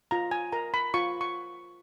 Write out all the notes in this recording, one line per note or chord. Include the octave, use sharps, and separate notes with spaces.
F4 A#5
G#5
A#4 A#5
B5
F4 C#6
C#6